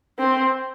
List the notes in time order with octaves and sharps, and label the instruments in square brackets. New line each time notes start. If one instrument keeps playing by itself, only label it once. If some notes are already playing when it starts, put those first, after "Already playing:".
[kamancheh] C4